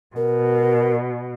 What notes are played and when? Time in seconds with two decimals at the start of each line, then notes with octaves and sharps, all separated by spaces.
0.16 B2 A#4